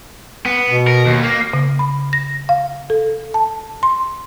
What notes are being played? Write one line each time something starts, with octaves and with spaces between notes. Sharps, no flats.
B3
B2
A#4
D#2
A#3
C#3
B5
A#6
F5
A4
A5
C6